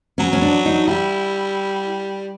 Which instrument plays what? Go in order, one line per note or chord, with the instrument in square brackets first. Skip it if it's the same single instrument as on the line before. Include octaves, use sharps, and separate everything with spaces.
[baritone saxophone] F#3 [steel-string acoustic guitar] C#4
[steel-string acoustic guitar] C#4
D4
D#4
[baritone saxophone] G3 [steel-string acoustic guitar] E4